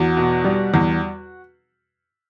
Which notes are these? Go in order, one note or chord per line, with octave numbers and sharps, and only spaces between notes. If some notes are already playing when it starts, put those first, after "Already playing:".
Already playing: E2 F#4
B2
G3
E2